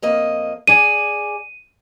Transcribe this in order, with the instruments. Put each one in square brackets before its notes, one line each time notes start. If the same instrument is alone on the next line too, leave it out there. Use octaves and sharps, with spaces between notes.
[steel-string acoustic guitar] F2 A#3 D#5
[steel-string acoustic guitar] G#4 D5 G#5 [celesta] D#7